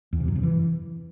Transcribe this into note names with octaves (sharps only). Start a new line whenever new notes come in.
E2
C3
F#2
C3
E3